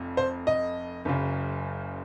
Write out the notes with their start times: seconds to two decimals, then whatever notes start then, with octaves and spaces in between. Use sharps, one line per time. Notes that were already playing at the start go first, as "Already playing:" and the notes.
Already playing: F1 F2
0.17 C5
0.47 D#5
1.05 F#1 F#2 C#3